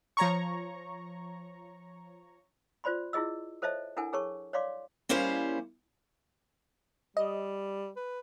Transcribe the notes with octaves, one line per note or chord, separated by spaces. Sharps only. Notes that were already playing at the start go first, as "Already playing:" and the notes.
F3 C#5 A#5 C#6
F4 C5 D5 B5 C6
E4 F4 G#4 D#5 E6
A4 C5 C#5 D#5 E5 A5
D4 E4 A4 A#4 F#5 G#5
G#4 A#4 C#5 A5 C#6
C#5 D5 F5 C6 D6
G3 A#3 C#4 E4 C5 F5
G3 D#5
B4